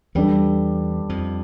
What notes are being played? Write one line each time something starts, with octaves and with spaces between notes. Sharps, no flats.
E2 E3 G3 D4 A4
F2 F3